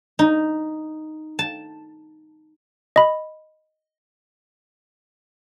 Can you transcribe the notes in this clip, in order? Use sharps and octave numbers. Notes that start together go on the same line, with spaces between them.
D#4
A5
D#5 B5